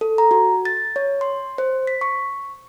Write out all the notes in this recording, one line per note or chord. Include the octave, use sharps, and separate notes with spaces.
A4
A#5
F#4
A6
C#5
C6
C5
B6
C#6